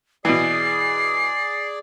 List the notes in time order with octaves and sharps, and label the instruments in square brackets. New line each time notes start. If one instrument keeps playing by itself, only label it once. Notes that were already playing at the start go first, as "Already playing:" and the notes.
[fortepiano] B2 E3 [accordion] G#4 D5 [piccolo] C7